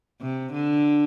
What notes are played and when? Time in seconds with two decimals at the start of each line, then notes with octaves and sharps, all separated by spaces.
0.21 C3
0.53 D3